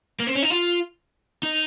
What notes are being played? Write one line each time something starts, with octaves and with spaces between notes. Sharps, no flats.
A#3
C4
C#4
D#4
F4
D#4